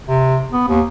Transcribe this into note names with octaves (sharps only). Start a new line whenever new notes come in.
C3
B3
D#2